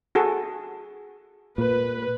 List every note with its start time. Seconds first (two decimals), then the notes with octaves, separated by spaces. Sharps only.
0.15 F#4 G#4 A4
1.58 A#2 B4